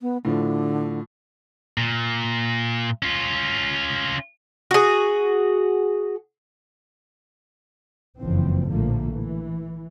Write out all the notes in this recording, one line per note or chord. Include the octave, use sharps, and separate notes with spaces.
B3
A2 D3 F3
A#2
C#4 F4
F#4 G#4
F#1 F2 E3 F3 C4
A#1 A2 D3 F3 A3 A#3
E3